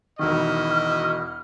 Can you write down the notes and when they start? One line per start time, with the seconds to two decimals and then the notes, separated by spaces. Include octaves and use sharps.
0.19 E1 D#3 E4 F#4 D#5 F6